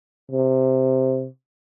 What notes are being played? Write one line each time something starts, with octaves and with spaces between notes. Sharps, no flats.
C3